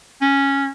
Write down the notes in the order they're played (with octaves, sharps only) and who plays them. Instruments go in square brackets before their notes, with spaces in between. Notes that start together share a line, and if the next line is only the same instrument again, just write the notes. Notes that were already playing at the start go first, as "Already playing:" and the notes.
[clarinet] C#4